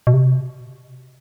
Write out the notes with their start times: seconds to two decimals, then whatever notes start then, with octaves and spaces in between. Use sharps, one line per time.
0.07 B2
0.14 C3